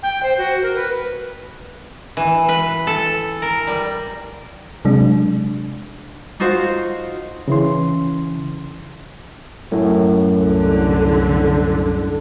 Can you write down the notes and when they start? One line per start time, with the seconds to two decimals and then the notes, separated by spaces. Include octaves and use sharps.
0.03 G5
0.23 C5
0.38 F#4
0.63 A#4
0.76 B4
2.17 E3
2.49 B4
2.87 A4
3.42 A#4
3.67 G3
4.85 C3 F#3 G#3 D4
6.40 D#4 F4 F#4 C5
7.48 C#3 E3 C6
9.72 F#2 A2
10.38 C2 D3